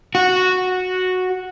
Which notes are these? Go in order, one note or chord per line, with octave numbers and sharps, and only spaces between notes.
F#4